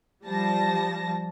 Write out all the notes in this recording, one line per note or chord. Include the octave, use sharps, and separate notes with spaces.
F3 G3 A5 A#6